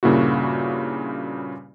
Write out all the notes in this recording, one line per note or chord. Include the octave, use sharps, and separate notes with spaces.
G2 A#2 C#3 A#3 E4 F#4